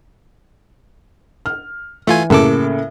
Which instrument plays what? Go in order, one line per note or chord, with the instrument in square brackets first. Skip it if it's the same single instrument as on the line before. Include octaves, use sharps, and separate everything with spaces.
[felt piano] F6
[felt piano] E3 [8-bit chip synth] A3 F4 G#5
[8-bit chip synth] F#2 A4 D6 [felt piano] A2 C#3 A#3